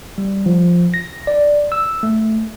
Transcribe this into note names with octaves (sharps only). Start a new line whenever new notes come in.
G3
F3
A#6
D5
E6
A3